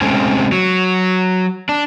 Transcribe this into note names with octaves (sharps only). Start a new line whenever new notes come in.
C3 G#3 A3 C4 C#4
F#3
D4